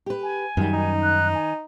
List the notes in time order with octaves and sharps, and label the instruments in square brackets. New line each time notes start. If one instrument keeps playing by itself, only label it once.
[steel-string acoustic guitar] G4 B4
[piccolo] G#5
[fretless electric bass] F#2 G3 [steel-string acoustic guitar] D#3
[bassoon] D#4
[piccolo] F#6
G#5